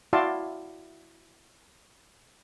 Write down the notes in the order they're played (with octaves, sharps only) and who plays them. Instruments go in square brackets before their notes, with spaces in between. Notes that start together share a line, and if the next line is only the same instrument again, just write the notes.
[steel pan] E4 F#4 D5 F5 A5 C6